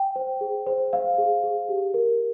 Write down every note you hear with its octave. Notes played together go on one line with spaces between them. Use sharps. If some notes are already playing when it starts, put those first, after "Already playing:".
Already playing: G5
C5
G#4
C5
F5
G#4
G#4
G4
A#4